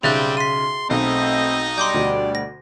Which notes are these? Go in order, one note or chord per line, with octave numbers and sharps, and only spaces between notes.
B1 C#3 G3 C4 G#4 E5 F#6 A6
C6 B6 D#7
B1 A3 B3 C4 D#4 D#5
G3 D4 D5 C6 D6 G6
D2 B2
A#6